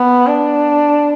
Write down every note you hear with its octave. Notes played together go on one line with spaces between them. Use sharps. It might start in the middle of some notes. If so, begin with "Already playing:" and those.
Already playing: B3
D4